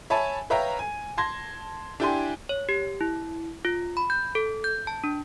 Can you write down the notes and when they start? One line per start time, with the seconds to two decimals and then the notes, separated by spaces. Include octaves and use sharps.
0.10 C#5 E5 G#5 A5 B5
0.50 B4 C#5 E5 F5 G5 A#5
0.79 G#5
1.17 A5 C6 G#6 A#6
2.00 D4 E4 G4 G5 G#5 C6
2.49 C#5
2.69 G4
3.01 E4
3.65 F4
3.97 B5
4.10 G6
4.35 A4
4.64 G6
4.87 A5
5.04 D4